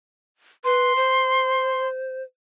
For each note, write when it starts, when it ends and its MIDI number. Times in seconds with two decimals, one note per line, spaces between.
0.64 0.96 71
0.64 1.88 84
0.96 2.23 72